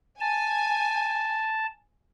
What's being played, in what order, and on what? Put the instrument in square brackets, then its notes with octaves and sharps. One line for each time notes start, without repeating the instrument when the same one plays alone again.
[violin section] G#5 [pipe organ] A5